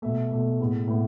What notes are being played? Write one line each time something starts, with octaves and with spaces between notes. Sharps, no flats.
B2 A3 E5
B2 A3
A2 G#3 B3
A2 G#3 B3